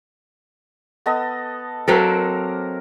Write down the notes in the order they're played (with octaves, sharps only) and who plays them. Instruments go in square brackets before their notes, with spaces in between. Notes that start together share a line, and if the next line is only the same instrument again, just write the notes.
[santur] B3 A4 D#5
[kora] F#3 C4 A4 [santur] A#3 A#4